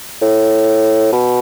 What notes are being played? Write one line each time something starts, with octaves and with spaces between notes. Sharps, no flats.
A2
B2